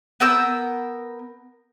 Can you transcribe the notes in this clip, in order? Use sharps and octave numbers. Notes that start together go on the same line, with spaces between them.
B3 A#4 E6 G6